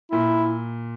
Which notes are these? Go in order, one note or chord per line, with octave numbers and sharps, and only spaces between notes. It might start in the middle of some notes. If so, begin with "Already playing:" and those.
A#2 E4